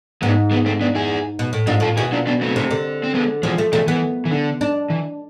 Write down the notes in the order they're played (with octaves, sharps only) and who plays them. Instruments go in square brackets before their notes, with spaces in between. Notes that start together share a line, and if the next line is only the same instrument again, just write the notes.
[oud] G#2 [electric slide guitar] G#3 B3
[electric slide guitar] G#3 B3
A3 C4
B3 D4
E4 G#4
[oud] B2
A2
[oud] G#2 [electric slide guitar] D4 F4
[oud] A2 [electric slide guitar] F4 A4
[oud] B2 [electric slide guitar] E4 G#4
[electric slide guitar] D4 F4
B3 D4
A3 C4
[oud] C3
D3
[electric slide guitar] C4
G#3 B3
[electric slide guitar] E3 G#3 [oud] F3
[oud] A3
[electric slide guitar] E3 G#3 [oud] A3
[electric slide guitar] E3 [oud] B3
[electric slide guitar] E3
D3
[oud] D4
[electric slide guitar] E3